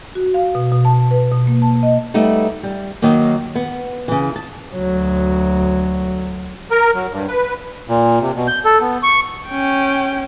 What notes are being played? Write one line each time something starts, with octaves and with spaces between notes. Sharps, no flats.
F#4
F5
B2
B2
A5
B4
B2
A#3
A5
D#5
G3 A3 B3 D#4
G3
D#3 F#3 A#3
B3
C#3 E3
A5
D2 F#3
A#4
F#3
G2
B4
A#2
C3
B2
G6
A4
B3
C#6
C#4 G5